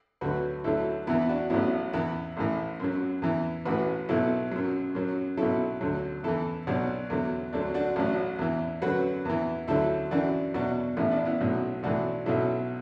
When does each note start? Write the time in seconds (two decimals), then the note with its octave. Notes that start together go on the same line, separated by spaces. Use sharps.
0.21 D2 D3 F#3 F#4 B4
0.64 D2 D3 F#3 E4 A4
1.07 E2 E3 B3 E4
1.29 D4 F#4
1.50 A1 A2 F#3 B3 E4
1.93 E2 E3 B3 E4
2.37 A1 A2 E3
2.80 F#2 F#3
3.22 E2 E3
3.65 A1 A2 E3 F#4 B4
4.09 B1 B2 F#3 E4 A4
4.51 F#2 F#3
4.95 F#2 F#3
5.37 B1 B2 F#3 E4 A4
5.81 D2 D3 F#3
6.23 E2 E3 E4 A4
6.67 B1 B2 F#3 D4 F#4
7.10 E2 D3 F#3
7.53 D2 D3 F#3 D4
7.74 D4 F#4
7.96 A1 A2 F#3
8.39 E2 E3
8.82 F#2 D3 F#3 F#4 B4
9.25 E2 E3
9.68 D2 D3 F#3 E4 A4
10.11 F#2 E3 D4 F#4
10.54 E2 B2 F#3 D4 F#4
10.97 A1 A2 E3 B3 E4
11.11 D4
11.25 B3 E4
11.41 B1 A2 F#3
11.83 B1 A2 E3 D4 F#4
12.26 B1 B2 F#3 E4 A4